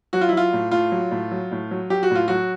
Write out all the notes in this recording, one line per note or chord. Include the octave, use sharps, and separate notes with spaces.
F#3 F#4
F4
E4
F#3 F4
A2
A2 F4
F#3
A2
F#3
A2
F#3
F#3 G4
F#4
A2 F4
F#3 F#4